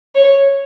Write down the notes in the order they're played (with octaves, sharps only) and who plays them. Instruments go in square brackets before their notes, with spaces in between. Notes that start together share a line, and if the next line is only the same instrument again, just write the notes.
[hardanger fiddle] C#5